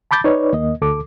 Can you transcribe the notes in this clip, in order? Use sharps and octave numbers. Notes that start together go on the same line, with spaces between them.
A5 B5 D6 G6 A6
D#4 B4 C#5 D5
D#2 A#3 D#5
D2 A4 D6